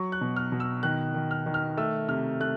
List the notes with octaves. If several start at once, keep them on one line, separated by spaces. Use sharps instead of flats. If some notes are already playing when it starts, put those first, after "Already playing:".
Already playing: F#3 C#6
F#6
B2
F6
B2
E6
D#3 F#6
D#3
F6
D#3
F6
A3 E6
C3 F6
A3 F#6